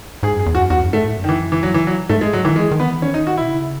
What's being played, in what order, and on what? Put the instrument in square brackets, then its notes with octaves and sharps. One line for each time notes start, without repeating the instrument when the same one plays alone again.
[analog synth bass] G#2 [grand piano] G#4
[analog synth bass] F#2 [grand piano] G#4
[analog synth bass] E2
[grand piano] F#4
[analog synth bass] F#2
[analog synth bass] E2 [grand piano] F#4
[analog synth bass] F#2
[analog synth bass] G#2 [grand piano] A3
[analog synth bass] A2
F#2
[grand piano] D#3
E3
E3
F#3
E3
F#3
[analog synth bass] G#2 [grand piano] A3
[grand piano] G#3
F#3
[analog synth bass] D#3 [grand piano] E3
[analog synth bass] E3 [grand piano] G#3
[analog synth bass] D#3
[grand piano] B3
[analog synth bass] E3
[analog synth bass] D#3 [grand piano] C#4
[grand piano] D#4
F#4
[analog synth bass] B2 [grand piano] E4
[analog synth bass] C#3